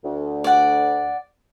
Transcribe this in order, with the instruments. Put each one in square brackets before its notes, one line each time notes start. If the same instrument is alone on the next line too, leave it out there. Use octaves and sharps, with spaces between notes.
[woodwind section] D2
[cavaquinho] D5 F#5